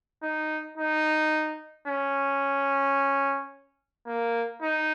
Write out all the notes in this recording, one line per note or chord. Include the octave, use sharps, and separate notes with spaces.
D#4
D#4
C#4
A#3
D#4